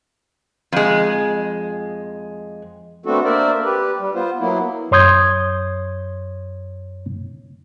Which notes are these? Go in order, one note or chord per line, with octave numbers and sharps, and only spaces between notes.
F2 G#3
A3 B3 C4 D4 F#4 A4
A#3 D4 A#4 C5 D5 E5
G4 B4
G3
B3 F4 C5
F#3 A#3 B3 E4
F#2 C#5 C6 D#6 G6 G#6